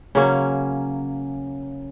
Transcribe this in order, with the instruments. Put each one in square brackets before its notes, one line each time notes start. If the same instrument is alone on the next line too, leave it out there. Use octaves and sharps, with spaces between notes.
[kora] C#3 F#3 A#3 C#4